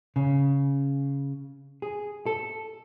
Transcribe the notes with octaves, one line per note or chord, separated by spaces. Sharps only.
C#3
G#4
A4